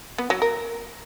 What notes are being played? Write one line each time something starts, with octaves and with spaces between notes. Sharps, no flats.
B3
F#3
A#4